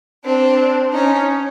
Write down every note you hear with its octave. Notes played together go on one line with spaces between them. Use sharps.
C4 D4
C#4 D#4